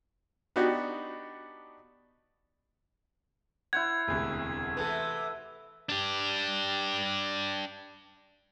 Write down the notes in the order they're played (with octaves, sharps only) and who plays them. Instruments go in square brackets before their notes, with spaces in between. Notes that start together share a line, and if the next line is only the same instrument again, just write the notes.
[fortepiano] B3 D4 D#4 F#4 G4
[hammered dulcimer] E4 C5 F#5 [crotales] G#6
[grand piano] E1 D2 C3
[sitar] C3 E3 [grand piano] A4 B4
[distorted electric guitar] D4 G4